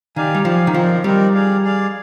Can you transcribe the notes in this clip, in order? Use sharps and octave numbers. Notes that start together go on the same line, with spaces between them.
D#3 G4 D5 F5 G#5
G3
F3 G4 D5 F5 G#5
D#3
F3 C4 D#4 A#4 D5
G3 C4 D#4 A#4 D5
G#4 D5 F5
G#4 D5 F5